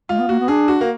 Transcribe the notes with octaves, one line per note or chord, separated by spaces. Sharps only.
G#3 F4
B3
A#3 F#4
B3
D4 G#4
F#4
A#3